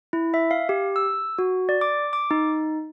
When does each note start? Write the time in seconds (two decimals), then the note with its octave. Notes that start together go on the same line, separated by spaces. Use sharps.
0.13 E4
0.34 E5
0.51 F5
0.69 G4
0.96 E6
1.39 F#4
1.69 D5
1.81 D6
2.13 D6
2.31 D#4